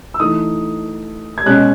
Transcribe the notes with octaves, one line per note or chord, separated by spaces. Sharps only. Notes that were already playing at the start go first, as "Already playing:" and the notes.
E6
E3 A3 D#4 D#6
G#6
B2 G#3 C#4 F#6